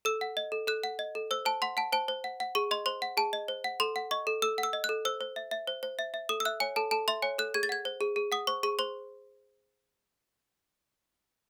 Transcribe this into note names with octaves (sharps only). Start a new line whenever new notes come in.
A4 E6
F#5
D#5
A4
A4 F#6
F#5
D#5
A4
C5 E6
C5 A5
F#5 C6
F#5 A5
C5 A5
C5
F#5
F#5
G#4 C#6
D#5 C6
C5 C6
F#5
G#4 A5
D#5
C5
F#5
A4 C6
F#5
D#5 C#6
A4
A4 E6
F#5
E6
D#5
F#6
A4
C5 E6
C5
E5
E5
C5
C5
E5
E5
A4 D#6
E6
E5 F#6
C#5 G#5
A4 A5
A4 A5
E5 C6
C#5 G#5
A4 F#6
G#4 G#6
A6
F#5 G#6
C5
G#4
G#4
F#5 D#6
C5 C#6
G#4 C#6
C5 C6